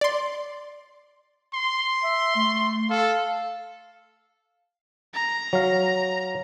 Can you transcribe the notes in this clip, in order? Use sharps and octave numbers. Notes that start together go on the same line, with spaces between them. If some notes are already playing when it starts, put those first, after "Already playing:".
D5 C6
C6
E5
A3
A4 F5
A#5
F#3 F5